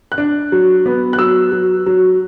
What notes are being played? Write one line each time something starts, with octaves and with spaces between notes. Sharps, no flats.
F#6
D4
F#3
B3
F#6
F#3 E6
F#3
F#3